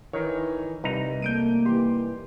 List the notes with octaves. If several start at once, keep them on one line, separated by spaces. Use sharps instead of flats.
D#3 E3 D#4 C#5
C2 G3 D#4 B4 A#5
A3 A#3 G6 D7 D#7
E3 G4 C6